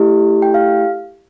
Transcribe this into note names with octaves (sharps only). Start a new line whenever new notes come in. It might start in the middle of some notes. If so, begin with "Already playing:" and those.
Already playing: A3 E4 G4
G5
F5